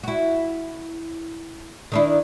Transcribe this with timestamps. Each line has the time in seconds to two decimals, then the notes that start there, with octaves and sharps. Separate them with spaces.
0.03 E4 F#4
1.92 D#3 D4 E4